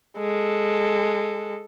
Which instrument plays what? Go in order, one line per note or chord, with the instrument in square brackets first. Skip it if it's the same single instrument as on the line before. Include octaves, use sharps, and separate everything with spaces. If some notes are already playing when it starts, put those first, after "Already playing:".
[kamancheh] G#3 A4